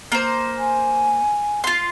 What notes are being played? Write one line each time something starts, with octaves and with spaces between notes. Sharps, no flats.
A#3 C5
G#5
F4 C6